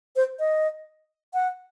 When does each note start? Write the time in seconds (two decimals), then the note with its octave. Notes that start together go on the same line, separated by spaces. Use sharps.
0.16 C5
0.39 D#5
1.34 F#5